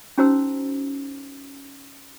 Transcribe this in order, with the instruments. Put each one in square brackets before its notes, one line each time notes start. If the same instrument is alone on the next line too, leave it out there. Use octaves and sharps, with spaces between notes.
[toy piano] C#4 D#4 F#4 C5 A#5 E6